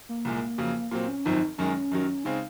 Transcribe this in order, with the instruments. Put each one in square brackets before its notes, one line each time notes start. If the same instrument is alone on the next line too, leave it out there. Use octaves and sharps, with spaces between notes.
[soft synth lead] A#3
[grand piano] C2 A#2 G#3
F2 C#3 F#3
[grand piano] A#2 F#3 C4 [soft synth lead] A#3
[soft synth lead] C#4
[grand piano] G#1 F#2 F3 C4 [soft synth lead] D#4
[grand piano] F#2 D#3 G#3 [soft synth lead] C#4
[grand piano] F#2 D#3 F#3
[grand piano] C#3 G#3 C4 [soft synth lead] D#4